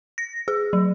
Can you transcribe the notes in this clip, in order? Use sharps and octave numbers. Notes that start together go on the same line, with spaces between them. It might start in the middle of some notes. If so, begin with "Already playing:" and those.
A#6
G#4
F#3